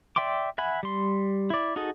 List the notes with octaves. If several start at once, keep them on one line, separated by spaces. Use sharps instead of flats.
D5 E5 G5 C6 D6
E5 F#5 G#5 B5
G3 C6
E4 D5
D#4 F#4 G#4 A4 D#5